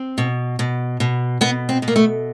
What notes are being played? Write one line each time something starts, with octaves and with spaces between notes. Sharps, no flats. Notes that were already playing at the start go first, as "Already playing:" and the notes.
Already playing: C4
B2
B2
B2
B2 B3
C4
B2
A#3
A3